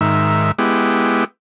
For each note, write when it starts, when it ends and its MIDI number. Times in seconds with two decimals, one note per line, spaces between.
0.01 0.51 44
0.01 0.51 51
0.01 0.51 76
0.59 1.24 56
0.59 1.24 59
0.59 1.24 64
0.59 1.24 67